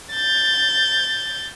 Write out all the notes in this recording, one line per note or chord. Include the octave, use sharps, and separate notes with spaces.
G6 A6